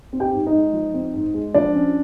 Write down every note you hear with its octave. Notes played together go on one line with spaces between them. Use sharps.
C4
G4 G5
G#2
D#4 D#5
G#3
F3
C4
G#2
G#3
F3 D4 D5
C#4